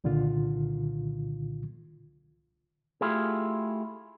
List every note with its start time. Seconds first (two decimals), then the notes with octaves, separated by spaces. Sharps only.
0.04 C2 A#2 D3 D#3 F4
3.01 A3 E4 F4 G4 G#4